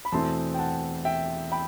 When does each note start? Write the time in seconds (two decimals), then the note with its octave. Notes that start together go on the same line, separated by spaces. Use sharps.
0.05 B5
0.12 E2 B2 A3 C4 E4 A5 C6
0.54 G5
0.59 F#5 A5
1.05 E5 G5
1.52 G5 B5